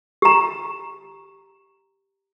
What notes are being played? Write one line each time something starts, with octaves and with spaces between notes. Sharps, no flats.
G4 A#5